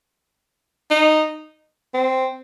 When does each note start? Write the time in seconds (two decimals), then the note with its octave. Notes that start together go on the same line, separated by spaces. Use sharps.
0.91 D#4
1.94 C4